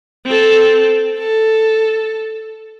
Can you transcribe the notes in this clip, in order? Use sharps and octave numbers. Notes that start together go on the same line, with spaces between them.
C4 A4
A4